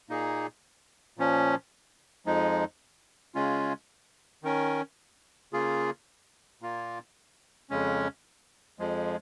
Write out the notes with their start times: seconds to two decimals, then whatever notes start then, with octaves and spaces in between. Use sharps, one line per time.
0.09 A#2 A#3 D#4 G#4
1.17 A#2 F3 C#4
2.26 F2 F3 G#3 D#4
3.35 C#3 G#3 C#4 F4
4.43 D#3 C#4 A#4
5.53 C#3 A#3 F4 G#4
6.62 A#2 A#3 F4
7.70 F2 C#3 G#3 C#4
8.79 F2 F3 G#3